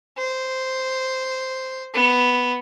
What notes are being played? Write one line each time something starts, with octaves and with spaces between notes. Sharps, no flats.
C5
B3